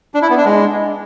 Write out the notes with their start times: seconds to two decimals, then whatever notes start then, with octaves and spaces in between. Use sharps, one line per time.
0.14 D4
0.22 E4
0.30 B3
0.37 D4
0.45 G#3